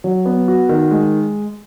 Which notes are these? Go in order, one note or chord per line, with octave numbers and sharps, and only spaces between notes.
F#3
B3
F#4
D#3
G#3